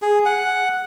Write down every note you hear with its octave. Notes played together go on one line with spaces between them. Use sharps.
G#4
F#5